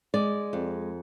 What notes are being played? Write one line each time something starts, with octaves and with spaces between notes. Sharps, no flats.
G#3 D5
F2